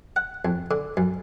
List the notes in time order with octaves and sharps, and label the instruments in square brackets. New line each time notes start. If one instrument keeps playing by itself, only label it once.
[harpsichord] F#5
F2
D3
F#2